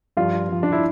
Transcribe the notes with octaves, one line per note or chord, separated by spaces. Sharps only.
G2 F3 F4
G2 F3
D4
E4